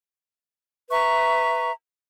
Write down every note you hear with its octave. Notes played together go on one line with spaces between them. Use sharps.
B4 E5 A#5 C#6